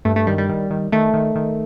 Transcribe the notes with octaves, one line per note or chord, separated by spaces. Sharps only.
G2 A3
A3
D#3 G3
G3
D#3
D#3
D#3 A3
D#3
D#3